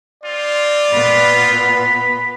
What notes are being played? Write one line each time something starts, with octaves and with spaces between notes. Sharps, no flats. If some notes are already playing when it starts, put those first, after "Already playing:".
C4 F4 D5
A#2 B3 B5